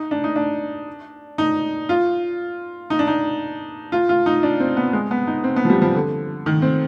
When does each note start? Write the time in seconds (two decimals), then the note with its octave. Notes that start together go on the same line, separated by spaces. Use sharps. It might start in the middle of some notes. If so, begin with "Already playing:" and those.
Already playing: D#4
0.11 D4
0.24 D#4
0.36 D4
1.38 D#4
1.89 F4
2.90 D#4
2.99 D4
3.07 D#4
3.92 F4
4.09 F4
4.26 D#4
4.43 D4
4.60 C4
4.77 B3
4.93 G#3
5.11 B3
5.27 D#4
5.44 C4
5.56 B3
5.65 F3
5.70 G3
5.82 F3
5.95 D3
6.46 D#3
6.62 C4